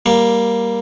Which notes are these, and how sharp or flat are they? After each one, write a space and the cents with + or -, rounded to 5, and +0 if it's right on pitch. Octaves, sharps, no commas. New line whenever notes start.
G3 +0 A#3 +5